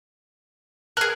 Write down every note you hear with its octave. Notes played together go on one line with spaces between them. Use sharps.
G#4 A#4 F#6